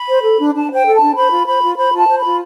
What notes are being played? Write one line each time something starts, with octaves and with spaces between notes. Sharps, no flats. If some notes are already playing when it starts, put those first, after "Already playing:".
Already playing: B5
C5
A4
D4
D4 A5
C5 G5
A4
D4 A5
C5 B5
F4
C5 B5
F4
C5 B5
F4
A5
C5
F4 B5